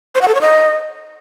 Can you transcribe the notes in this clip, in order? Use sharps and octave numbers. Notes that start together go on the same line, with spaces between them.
C5
F#5
A4
C#5
D#5